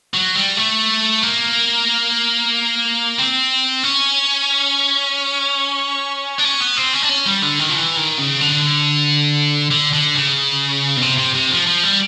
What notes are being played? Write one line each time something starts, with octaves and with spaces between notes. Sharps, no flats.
F#3
G3
A3
A#3
C4
C#4
D4
C#4
B3
C4
C#4
D4
C#4
G3
D3
D#3
F3
E3
D#3
C#3
D3
D3
D3
C#3
B2
C3
C3
C3
F3
F3
G3